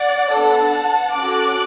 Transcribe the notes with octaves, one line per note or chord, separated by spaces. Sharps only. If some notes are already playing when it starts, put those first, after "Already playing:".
Already playing: D5 F#5
B3 D4 A4 F#5 A5
C#4 F#4 A4 D6 F#6